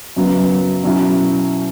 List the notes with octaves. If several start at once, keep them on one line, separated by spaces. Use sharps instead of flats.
F#2 C#3 F#3 B3
B2 F#3 C#4 E4